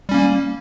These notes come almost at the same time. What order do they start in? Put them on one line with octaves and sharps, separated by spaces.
G3 C#4 A#3